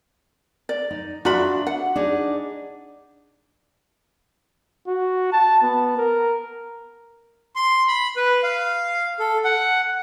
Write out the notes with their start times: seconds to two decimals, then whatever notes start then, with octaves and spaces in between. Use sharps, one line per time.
0.69 D5
0.91 D#4
1.25 D4 F4 F#4 E5 B5
1.67 F#5
1.96 D4 D#4 G#4
4.87 F#4
5.32 A5
5.62 B3
5.97 A#4
7.56 C6
7.88 B5
8.16 B4
8.43 F5
9.19 A4
9.44 F#5